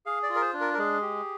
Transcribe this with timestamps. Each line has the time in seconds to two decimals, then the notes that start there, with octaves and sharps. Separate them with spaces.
0.06 G#4 F5
0.23 D5
0.30 F4
0.35 A#4
0.41 C5
0.54 D4
0.61 A#4
0.74 A#4
0.79 G#3 G#4
1.02 G4